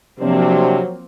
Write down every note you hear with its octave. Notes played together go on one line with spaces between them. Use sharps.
C3 F3 F#3 A#3 C4 D4 G4